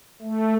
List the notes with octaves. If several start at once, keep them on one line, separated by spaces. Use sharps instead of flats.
A3